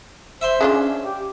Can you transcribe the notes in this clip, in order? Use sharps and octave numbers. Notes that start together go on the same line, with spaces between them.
C5 E5 C6
G#3 C#4 D4 F4
G4